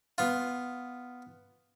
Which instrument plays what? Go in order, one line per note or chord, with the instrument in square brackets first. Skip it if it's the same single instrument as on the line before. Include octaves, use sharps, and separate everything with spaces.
[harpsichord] B3 F4